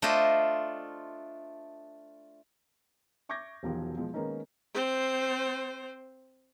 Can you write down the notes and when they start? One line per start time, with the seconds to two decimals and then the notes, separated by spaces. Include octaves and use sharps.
0.02 A3 D4 F4 C5 D#5 E5
3.29 E5 C#6 D6 G6 G#6 A#6
3.63 E1 B1 E2 D#3 F3 G4
3.97 B2 F3 G#3
4.14 D#3 G#3 A#3 B3 C#4 D#4
4.74 C4 C5